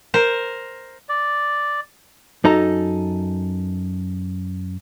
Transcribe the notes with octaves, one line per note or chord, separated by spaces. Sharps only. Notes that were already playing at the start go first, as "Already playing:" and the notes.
A#4 C5
D5
F#2 D#4 A4 A#5